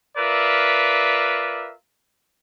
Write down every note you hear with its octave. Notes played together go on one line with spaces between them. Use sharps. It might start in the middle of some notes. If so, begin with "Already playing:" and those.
F4 A#4 B4 D5 E5